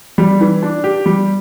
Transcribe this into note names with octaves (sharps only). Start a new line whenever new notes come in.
G3
E3
D4
G4
G3